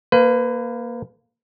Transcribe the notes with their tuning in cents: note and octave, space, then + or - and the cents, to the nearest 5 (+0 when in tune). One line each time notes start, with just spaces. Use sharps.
A#3 +0 B4 +30